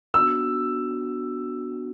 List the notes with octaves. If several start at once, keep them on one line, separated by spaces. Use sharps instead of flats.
B3 D4 F#4 E6